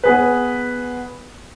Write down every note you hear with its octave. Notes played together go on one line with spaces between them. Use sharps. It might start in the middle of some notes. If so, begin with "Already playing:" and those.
B3 G#4 B4